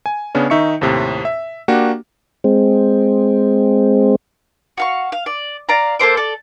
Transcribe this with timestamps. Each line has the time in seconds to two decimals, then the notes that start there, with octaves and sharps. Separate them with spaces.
0.06 G#5
0.35 C#3 B3 C#4 D4
0.50 D#3 D#4 E5 C#6 C#7
0.81 D#2 A2 C3
1.25 E5
1.68 A#3 D4 F#4 G4
2.44 G#3 C4
4.78 F#4 F5 C#6
5.12 F5
5.26 D5
5.69 D5 F5 A#5
5.99 A#3 A4 C5 D6
6.17 A4 D5